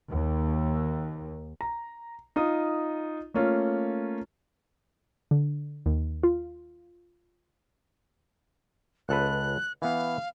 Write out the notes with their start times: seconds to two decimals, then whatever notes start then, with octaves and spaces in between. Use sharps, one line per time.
0.10 D#2
1.61 A#5
2.36 D#4 F4 D#6
3.34 A3 A#3 C#4 F4
5.31 D3
5.86 D#2
6.23 F4
9.09 C#2 A4 B4 F#6
9.82 E3 B3 F5